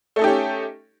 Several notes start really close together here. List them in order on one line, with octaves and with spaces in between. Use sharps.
A3 A4 D#4 G4 C#4